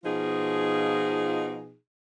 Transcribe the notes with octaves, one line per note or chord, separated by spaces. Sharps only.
B2 F3 D#4 F4 G#4